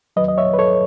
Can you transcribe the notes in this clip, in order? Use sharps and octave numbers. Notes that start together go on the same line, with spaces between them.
E2 D#3 F#3 B4 D#5
D#5
C#5 E5
B4
A4 C#5